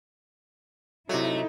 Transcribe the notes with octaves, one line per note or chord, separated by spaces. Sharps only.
C3 F#3 A3 D#4 E4